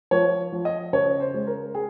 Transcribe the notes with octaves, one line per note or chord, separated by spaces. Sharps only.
F3 C#5
F3
D#5
C#3 C#5
C5
G#3
A#4
G#4